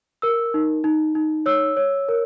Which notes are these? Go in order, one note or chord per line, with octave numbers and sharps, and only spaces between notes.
A#4 E6
D#4
D#4
D#4
C#5 E6
C#5
A#4